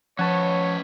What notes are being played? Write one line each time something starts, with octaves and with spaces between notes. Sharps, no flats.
F3 C#4 B4 C#5 F#5 A5